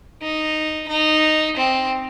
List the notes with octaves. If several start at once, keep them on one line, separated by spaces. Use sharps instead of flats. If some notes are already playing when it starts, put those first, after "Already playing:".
D#4
D#4
C4